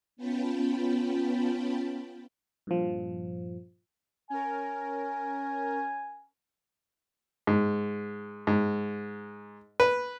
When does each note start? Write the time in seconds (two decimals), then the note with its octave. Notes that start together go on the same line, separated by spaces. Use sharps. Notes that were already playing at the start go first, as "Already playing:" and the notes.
0.17 B3 C#4 F4 G5 A5 B5
2.67 G2 A#2 F3
4.30 C#4 A#4 G#5
7.47 G#2
8.47 G#2
9.80 B4